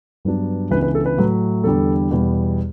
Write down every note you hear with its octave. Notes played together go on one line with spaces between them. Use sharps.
G2 F#3 B3 D4
C#2 C#3 E3 B3 D4 B4
B4
A4
B4
A2 F#3 A3
E2 D3 G3 A4
E2 B2 G3 B3